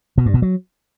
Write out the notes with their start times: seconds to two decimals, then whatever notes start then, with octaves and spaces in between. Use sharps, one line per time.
0.18 B2
0.26 G2
0.34 B2
0.42 F#3